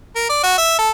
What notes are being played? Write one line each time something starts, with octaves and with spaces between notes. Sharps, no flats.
A#4
D5
F#4
E5
A4